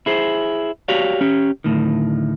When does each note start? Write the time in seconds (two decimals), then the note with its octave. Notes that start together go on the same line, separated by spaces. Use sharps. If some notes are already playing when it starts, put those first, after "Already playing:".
0.06 E4 G#4 C5
0.88 F#4 G4 C#5 D5 F5
1.21 C#4 G4
1.64 D2 A2 D#3